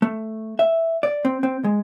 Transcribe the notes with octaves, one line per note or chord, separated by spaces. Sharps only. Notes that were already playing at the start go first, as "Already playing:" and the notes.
A3
E5
D5
C4
C4
G#3